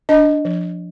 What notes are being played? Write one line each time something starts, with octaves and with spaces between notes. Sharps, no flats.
D4 D#5
F3